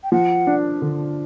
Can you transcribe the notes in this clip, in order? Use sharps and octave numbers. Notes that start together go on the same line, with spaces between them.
G5
F3 F#5
D4
D3